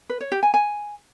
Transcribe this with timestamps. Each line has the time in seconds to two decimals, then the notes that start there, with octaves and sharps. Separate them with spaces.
0.09 B4
0.21 C#5
0.32 G4
0.43 G#5
0.54 G#5